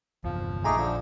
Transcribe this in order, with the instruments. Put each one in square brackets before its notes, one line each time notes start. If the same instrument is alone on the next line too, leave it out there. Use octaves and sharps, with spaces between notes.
[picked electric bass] G1 E2 [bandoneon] F3
[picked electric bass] A#1 [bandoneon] A3 D#4 G#4 [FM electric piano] G#5 A#5 D6
[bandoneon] D3 F3